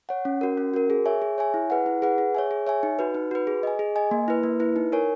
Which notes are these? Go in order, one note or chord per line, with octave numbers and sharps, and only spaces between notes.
C#5 F#5
C#4
F#4 A#4
C#4
F#4 A#4
G#4
C#5 E5 G#5
G#4
C#5 E5 G#5
E4
G#4 B4 F#5
E4
G#4 B4 F#5
G#4
C#5 E5 G#5
G#4
C#5 E5 G#5
D#4
F#4 B4
D#4
F#4 B4
G#4
D#5 G#5
G#4
D#5 G#5
A#3
E4 B4
A#3
E4 B4
D#4
A#4 C#5 G#5